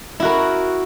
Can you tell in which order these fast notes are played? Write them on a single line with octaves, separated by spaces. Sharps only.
E4 F#4 A#4